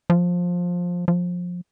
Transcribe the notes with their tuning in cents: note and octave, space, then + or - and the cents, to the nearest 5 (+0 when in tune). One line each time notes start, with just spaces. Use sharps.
F3 +15
F3 +25